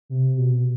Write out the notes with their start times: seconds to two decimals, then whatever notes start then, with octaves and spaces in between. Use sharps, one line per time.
0.09 C3
0.37 B2